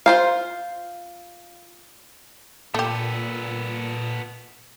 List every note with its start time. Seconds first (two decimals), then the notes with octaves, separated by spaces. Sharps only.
0.06 F4 C5 F5
2.74 A#2 A3 B3 G4 A4